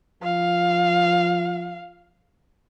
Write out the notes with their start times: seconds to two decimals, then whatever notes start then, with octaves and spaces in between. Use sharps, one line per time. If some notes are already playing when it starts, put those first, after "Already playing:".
0.23 F3 F5